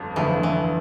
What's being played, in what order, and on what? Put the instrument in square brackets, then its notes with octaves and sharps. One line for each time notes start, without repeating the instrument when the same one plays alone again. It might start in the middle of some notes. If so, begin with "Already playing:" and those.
Already playing: [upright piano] G1 F2 F3
[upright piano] G1 F2 D3 F3 [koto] E3
[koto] E3